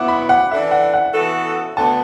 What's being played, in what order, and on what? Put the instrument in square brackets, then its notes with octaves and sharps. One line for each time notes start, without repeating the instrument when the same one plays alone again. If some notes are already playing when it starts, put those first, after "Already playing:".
Already playing: [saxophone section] B2 F#3 B3 E4 [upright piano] F#5 D6
[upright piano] B5
F#5
[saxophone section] E3 D4 A4 [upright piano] E5
[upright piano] F#5
F#5
[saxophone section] E3 B3 F#4 A4
[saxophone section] D2 D3 B3 [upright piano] A5